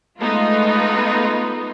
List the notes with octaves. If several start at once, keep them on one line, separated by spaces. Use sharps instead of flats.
G#3 A3 B3 D#4 F4